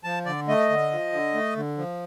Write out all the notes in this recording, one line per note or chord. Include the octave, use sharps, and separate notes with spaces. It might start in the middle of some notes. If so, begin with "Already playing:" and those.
F3 A5
D3 D5
A3 D#5
D3
F3
D3
A3
D3
F3